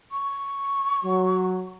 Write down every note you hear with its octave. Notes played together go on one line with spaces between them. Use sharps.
C#6
F#3